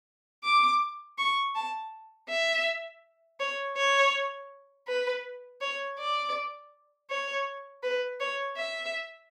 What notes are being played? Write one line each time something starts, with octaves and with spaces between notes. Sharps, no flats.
D6
C#6
A5
E5
C#5
C#5
B4
C#5
D5
C#5
B4
C#5
E5